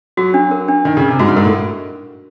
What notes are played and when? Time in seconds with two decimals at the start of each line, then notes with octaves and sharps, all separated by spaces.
0.17 F#3 F#4
0.34 D4
0.51 A#4
0.68 D4
0.85 D#3 D4
0.97 C#3
1.02 D4
1.08 C3
1.19 G#2 F#4
1.28 G2
1.36 G#2 A#4
1.45 A2